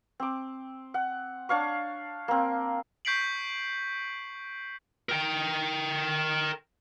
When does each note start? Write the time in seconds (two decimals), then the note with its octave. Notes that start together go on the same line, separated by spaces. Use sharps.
0.20 C4 D6
0.94 F#5
1.49 D4 C#5 F5 C#6
2.28 A#3 C4
3.05 C#6 G6 B6 C7 D7 F#7
5.09 A#4 G5